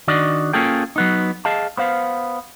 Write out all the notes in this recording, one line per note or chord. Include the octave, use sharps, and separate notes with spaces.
D#3 D4 F#4 D5 D#5
A#3 C#4 F4 G#4 A4 G5
F#3 B3 D#4
G#4 D#5 F5 A5
B3 C5 F5